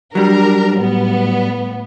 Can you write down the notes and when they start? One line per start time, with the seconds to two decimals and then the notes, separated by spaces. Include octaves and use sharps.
0.15 F#3 G3 D4 A#4
0.79 A2 B3